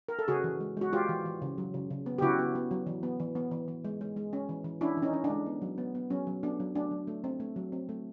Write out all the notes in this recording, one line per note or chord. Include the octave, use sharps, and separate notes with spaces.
A#4
A4
C#3 F#4 G#4
E3
G#3
G#3 F#4
G#3 F4 G4
E3
E3
C#3
F#3
C#3
C#3
B3
G4
C#3 E4 F#4
B3
B3
F#3
E3
B3
E3
B3
E3
E3
G#3
G#3
G#3
C#4
E3
E3
C#4 D4 E4
E3
C#4 D#4
C#4
D4
G#3
B3
F#3
B3
B3
F#3 C#4
F#3
B3 D4
F#3
A3 D4
F#3
A3
C4
A3
F#3
C4
A3